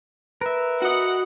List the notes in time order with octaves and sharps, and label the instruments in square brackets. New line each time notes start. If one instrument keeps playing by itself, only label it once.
[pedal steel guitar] A#4 E5 [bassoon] B4
[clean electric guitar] F#4 D#5 [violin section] F#5